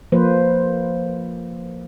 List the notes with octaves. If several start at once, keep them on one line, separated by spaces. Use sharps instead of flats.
F3 A#3 B4 C5